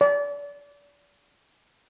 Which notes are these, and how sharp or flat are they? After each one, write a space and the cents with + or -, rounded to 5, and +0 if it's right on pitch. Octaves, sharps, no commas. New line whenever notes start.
D5 -30